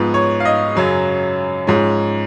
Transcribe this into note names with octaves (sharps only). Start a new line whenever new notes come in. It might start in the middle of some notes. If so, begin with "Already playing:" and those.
Already playing: G#2 F3 B3
C#5
F5
D#5
F#2 C#3 F#3 C#4
G#2 F3 G#3 C#4